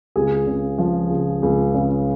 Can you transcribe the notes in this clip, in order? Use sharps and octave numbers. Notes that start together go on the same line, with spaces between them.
C#2 G#4
C#3
F3
C#2
C#2
C#3